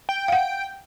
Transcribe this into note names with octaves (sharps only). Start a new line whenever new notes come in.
G5
F5 F#5